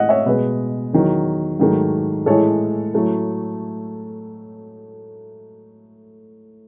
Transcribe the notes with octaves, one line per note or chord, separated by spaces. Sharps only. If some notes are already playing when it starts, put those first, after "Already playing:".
Already playing: A2 E3 G#3 D#5 F#5
C#5 E5
B2 G#3 B4 D#5
E2 D#3 F#3
G#2 D#3 F#3 A3
A2 E3 G#3 A4 C#5
A2 F#3 A3